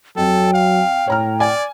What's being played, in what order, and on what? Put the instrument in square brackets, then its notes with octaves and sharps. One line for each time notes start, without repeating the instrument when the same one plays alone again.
[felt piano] F2 [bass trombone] F#3 [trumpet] A4 [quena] G5
[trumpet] F5
[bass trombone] A2 [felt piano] C#5 A#5 F6
[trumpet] D5 [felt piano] G#5